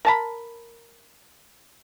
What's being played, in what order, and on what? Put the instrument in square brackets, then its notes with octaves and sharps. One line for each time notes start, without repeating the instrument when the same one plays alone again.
[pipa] A#4 A5 B5